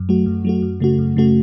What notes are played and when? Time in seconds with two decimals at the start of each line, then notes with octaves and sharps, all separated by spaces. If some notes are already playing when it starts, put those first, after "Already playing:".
Already playing: F#2
0.09 F#3 A3 F#4
0.26 F#2
0.45 F#3 A3 F#4
0.62 F#2
0.80 C#3 A3 F#4
0.99 F#2
1.17 C#3 A3 F#4